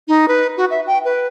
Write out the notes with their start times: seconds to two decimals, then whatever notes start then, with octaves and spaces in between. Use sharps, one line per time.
0.08 D#4
0.28 B4
0.57 F#4
0.70 E5
0.87 G5
1.05 B4